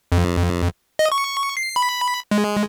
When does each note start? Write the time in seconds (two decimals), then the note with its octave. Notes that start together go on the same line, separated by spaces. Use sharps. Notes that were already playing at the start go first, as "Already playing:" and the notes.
0.12 F2
0.99 D#5
1.12 C#6
1.57 C7
1.76 B5
2.31 G#3